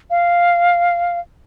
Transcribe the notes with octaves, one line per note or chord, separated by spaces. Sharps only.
F5